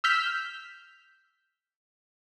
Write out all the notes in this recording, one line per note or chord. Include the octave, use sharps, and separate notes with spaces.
E6 F6 G6 B6